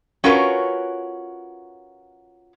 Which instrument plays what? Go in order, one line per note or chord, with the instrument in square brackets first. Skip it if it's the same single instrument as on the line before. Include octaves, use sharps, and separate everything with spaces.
[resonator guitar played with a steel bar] C#4 F4 F#4 A#4 B4 C#5